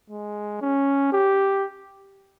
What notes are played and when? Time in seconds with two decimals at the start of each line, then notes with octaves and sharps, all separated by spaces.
0.10 G#3
0.62 C#4
1.13 G4